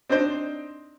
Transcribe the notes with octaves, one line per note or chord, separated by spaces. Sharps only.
C4 D4 D#4 C5